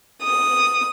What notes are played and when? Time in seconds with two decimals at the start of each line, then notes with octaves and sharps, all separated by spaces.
0.23 D#6